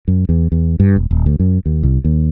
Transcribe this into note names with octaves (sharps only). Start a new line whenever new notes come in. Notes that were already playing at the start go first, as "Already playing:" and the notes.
F#2
E2
E2
G2
E1
D#1
D2
F#2
D#2
C2
D#2